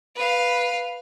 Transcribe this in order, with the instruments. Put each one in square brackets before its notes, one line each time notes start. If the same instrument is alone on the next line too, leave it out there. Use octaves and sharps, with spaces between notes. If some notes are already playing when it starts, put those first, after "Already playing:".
[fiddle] B4 F5